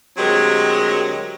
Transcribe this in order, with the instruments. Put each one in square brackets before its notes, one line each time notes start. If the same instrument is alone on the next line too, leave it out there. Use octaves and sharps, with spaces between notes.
[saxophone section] D2 F#3 G#3 C4 G4 A#4